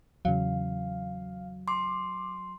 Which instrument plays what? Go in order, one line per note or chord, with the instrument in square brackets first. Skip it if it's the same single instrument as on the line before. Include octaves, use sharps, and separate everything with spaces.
[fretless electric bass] E2 C#3 [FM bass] F#3 [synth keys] F5
[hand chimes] C6 [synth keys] D6